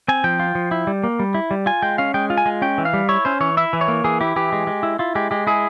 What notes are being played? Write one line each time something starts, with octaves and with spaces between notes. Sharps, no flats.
C4 G#5
F3 G5
F4
F3
E4
G3
A#3
G3
E4
G3
F4 G#5
G#3 G5
C#4 F5
G#3 G5
F4
G#5
G#3
C#4 G5
E3
F5
G3
E4 C#5
C#4 C5
E3 C#5
E4 E5
E3
C#5
A#3
E3 G#4
E4 G4
E3 G4
G#3
G#3
E4
E4 F4
G#3 G4
G#3 G4
E4 G#4